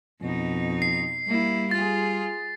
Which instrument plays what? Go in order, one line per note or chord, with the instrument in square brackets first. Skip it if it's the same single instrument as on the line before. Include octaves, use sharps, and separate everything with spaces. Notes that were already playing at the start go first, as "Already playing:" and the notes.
[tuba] F2 [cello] B2 D#4
[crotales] C7
[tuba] G3 [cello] A#3 E4
[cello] F4 G#4 [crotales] A6